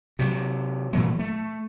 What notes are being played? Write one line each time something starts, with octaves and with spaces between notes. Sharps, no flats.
C3 F#3
A#2 E3 F#3 A3
A3